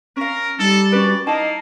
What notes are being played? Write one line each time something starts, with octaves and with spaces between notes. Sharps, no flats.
C#4 A#4 F5
G3 D#4 A4
C#4 F#4 B4 D5
A#3 D#4 E4 D#5 A5